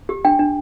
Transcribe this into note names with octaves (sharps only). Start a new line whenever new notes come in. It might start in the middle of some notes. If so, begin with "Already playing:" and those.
G4
D4 G5
D4